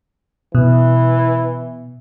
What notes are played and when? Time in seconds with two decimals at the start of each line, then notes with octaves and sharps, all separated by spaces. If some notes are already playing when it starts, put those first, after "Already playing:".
0.55 B2 E3